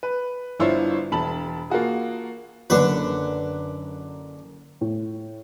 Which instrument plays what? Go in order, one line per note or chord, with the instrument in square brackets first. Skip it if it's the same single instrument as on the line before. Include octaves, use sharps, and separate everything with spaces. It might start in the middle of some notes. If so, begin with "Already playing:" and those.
[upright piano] B4
G1 D4 E4 F4 C5 C#5
E1 A5 B5 F#7
A#3 F4 F#4 G#4
[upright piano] F#1 F#2 [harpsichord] D3 B4
[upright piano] A2